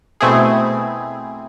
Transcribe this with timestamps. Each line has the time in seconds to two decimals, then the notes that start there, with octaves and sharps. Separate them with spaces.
0.21 B2 A3 C4 E4 G#4